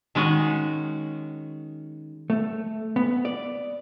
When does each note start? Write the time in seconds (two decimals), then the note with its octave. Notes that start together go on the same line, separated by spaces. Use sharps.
0.15 D#3 G#3 C#4 F#4
2.30 A3
2.96 B3
3.25 D5